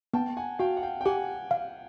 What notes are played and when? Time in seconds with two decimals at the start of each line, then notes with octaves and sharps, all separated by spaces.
0.13 B3 G5 A5
0.37 F#5 G#5
0.59 F#4 F5 G5
0.77 F#5
0.83 F5 G5
1.01 G5
1.05 G4 F#5 G#5
1.51 F5